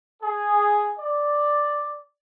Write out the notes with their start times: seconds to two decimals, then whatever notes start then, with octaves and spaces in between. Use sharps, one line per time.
0.21 G#4
0.99 D5